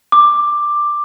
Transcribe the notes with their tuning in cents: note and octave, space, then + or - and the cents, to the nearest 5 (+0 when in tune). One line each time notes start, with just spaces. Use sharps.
D6 +10